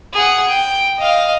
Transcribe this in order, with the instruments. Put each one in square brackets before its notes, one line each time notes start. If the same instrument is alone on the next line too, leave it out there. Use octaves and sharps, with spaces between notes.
[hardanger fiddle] G#4 F#5
G5
D#5 F5